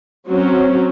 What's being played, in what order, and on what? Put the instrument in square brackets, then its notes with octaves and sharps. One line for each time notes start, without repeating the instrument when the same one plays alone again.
[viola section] F#3 C4 C#4